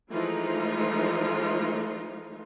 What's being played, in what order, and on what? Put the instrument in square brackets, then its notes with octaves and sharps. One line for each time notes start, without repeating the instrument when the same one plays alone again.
[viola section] E3 F3 G#3 A3 D#4 F4